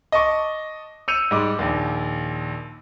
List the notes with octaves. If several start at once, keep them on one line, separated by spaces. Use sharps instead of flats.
D#5 A5 C#6 D6
E6 G6 C#7 D#7 F7
G#2 G3 D6
A#1 D#2